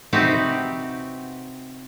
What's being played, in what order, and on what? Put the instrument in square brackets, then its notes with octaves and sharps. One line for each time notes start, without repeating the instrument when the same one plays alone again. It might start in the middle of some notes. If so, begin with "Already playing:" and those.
[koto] C3 C4 D#4 F#4 G4 B4